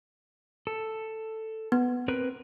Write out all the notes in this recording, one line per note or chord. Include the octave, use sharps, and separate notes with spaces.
A4
B3
C4 A#4 B4